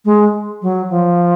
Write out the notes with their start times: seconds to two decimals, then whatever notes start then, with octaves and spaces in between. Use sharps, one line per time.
0.05 G#3
0.62 F#3
0.90 F3